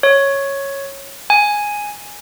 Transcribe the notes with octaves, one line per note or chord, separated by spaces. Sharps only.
C#5
G#5